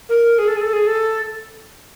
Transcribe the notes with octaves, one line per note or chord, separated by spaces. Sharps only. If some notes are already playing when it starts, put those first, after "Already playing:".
A#4
G#4
A4
G#4
A4
G#4
A4